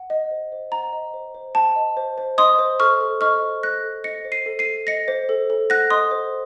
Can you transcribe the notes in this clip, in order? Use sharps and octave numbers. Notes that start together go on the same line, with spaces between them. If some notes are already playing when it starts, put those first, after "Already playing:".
Already playing: F#5
D#5
C5
C5
F#5 A#5
D#5
C5
C5
F#5 A5
D#5
C5
C5
D#5 C6 D#6
C5
A4 C#6 F6
A4
D#5 C#6 F6
C5
A4 F#6 A#6
A4
D#5 A#6 C#7
C5
C7 D#7
A4
C7 D#7
A4
D#5 A#6 C#7
C5
A4
A4
F#5 F#6 A#6
D#5 C6 D#6
C5